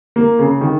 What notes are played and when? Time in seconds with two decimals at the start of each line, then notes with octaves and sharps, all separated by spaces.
0.16 A#3
0.39 C#3
0.61 D#3